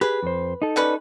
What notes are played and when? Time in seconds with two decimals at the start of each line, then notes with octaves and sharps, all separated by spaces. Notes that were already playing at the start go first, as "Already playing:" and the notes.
0.01 G4 G#4 B4
0.23 F2 C5
0.62 D#4 A4
0.76 G3 C#4 B4